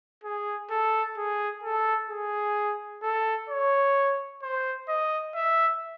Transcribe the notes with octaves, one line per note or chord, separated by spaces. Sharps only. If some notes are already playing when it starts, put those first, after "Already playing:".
G#4
A4
G#4
A4
G#4
A4
C#5
C5
D#5
E5